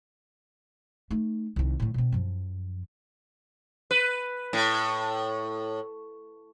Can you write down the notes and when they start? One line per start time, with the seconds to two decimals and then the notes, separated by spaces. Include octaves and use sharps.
1.11 A3 D#4
1.56 C2 D#3
1.80 A2 D3
1.94 B2 C4
2.12 F#2 F3
3.91 B4
4.53 A2